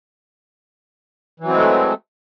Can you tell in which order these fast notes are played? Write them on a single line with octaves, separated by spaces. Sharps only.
E3 F#3 C4 G#3 A3